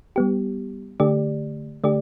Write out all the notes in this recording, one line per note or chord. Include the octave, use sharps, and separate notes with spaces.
G3 B3 G4
D3 A3 G4 D5
D3 A3 G4 D5